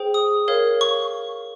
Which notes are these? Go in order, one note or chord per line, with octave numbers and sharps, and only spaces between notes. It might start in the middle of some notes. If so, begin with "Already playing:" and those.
Already playing: G#4 C5 G5
D#6
A#4 C#5 F5
C#6